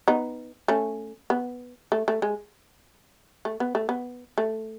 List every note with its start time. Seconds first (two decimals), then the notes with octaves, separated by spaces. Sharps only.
0.08 B3 D#4
0.68 A3 C#4
1.30 B3
1.92 A3
2.08 A3
2.22 G#3
3.45 A3
3.60 B3
3.75 A3
3.89 B3
4.38 A3